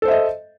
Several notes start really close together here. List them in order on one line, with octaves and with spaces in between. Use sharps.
A4 C5 E5 D#5